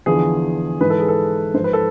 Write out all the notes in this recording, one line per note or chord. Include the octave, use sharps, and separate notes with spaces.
E2 D3 F3 G#4
G#2 E3 B4
A4
G#4
A4
G#2 F3 C5
B4
A4